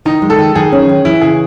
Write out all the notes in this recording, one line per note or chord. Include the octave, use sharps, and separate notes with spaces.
D#3 D#4
G#3
A4
D#3
D#3 G#4
C#4
D#3
E3 E4
C#3 G#4